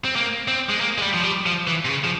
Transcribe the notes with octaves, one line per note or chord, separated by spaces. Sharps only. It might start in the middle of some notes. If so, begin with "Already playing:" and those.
C4
A#3
C4
G#3
A#3
G#3
G3
F3
G3
F3
E3
C3
C#3
F3